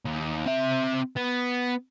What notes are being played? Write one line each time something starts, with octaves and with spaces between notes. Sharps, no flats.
D#2
C4 E5
B3